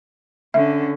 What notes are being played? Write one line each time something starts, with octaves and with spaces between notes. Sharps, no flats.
D3 C#4 E5